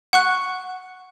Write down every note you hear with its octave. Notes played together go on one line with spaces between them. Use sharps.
F#5 C#6 F#6